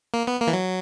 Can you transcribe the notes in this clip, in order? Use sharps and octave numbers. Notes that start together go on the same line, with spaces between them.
A#3
B3
A#3
E3
F#3